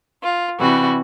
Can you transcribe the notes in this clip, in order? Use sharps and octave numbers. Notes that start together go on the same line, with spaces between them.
F4
C3 E3 G3 F#4